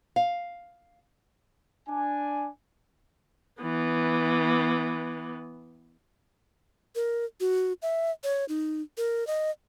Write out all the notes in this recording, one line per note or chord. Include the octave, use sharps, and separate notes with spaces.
F5
D4 G#5
E3 B3
A#4
F#4
E5
C#5
D#4
A#4
D#5